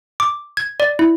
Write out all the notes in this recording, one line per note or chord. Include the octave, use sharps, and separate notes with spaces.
D6
G#6
D5
E4